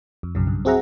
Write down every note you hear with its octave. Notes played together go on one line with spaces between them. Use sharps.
F2
B1 F#2 C#3
G2
C4 F#4 G#4 E5 F#5 A#5